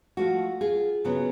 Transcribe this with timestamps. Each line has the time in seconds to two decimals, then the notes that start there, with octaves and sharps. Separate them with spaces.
0.17 F3 A3 C#4 F4 F#4
0.61 F4 G#4
1.04 C#3 F#3 B3